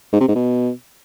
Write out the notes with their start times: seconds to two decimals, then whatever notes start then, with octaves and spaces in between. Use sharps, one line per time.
0.13 G#2
0.20 C3
0.28 G#2
0.36 B2